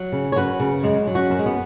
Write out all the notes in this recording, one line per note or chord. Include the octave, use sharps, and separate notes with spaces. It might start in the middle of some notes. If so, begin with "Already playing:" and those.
Already playing: F#3
C#3
C#5
F#2 F#4 B4
C#3
F#2 G#3
F#3
C#4 F#4
F#2
G#3
B3